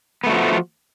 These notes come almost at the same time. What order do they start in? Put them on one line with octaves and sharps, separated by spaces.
B3 A3 F#4 F3